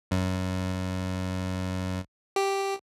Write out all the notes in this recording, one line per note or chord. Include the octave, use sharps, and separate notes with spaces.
F#2
G4